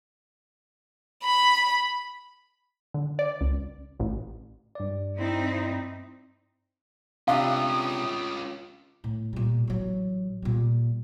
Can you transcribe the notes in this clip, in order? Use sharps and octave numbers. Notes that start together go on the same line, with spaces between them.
B5
D3
D5
C#2
A1
G2 D5
C4 D#4 E4
C3 C#4 D4 F4 F5 D#6
A2
A#2 G3
A1 F#3
A#2 G3